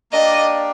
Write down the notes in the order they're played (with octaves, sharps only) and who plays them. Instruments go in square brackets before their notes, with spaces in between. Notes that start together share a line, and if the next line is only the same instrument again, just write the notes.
[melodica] A#3 D4 G4 D5 [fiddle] D#5